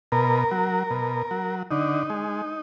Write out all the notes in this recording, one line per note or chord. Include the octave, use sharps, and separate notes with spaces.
B2 A#4
F#3
B2
F#3
D3 D#4
G#3